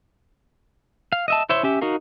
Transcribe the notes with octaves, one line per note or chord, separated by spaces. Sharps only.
F5
D#5 E5 A5
E4 C5 C#5 E5 C6
C#4 G4 E5
D#4 F#4 A#4 F5